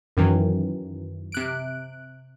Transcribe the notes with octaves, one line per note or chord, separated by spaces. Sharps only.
F#2 D#3 E3 F#3
C3 F#6 D7